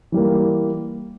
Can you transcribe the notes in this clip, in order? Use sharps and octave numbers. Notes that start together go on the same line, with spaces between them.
E3 G3 A#3